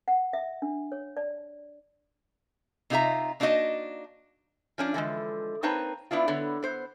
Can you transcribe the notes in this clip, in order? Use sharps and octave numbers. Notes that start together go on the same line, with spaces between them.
F#5
E5
D4
C#5
D5
C3 D#4 F4 G#4 E5 A#5
A#3 D4 D#4 F#4 D#5 A5
F3 C#4 D4
D3 E3 F3 G#3
A#3 C4 D#4 B4 C#5 A5
B3 D4 E4 F4
D3 B3 C#5
B3 C5